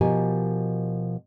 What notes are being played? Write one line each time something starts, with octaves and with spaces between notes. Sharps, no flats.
B2 F3 G4 A#4 G#5